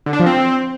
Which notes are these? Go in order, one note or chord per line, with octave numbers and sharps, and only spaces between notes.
D3
D4
F3
C4